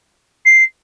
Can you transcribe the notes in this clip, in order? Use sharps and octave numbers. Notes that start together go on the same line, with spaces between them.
C7